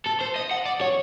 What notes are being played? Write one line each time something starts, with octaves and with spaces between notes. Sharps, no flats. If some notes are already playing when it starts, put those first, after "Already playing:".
A4
C5
D#5
F#5
D5
C#5